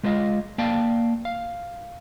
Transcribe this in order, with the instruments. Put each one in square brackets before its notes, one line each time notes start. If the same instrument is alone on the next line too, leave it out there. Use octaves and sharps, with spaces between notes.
[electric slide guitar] G#3 A3 F4 D#5 F5
A#3 D5 F5 G5 A5
F5